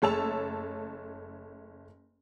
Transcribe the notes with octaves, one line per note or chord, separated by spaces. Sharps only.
F#1 A3 C#5 A5 E6 F7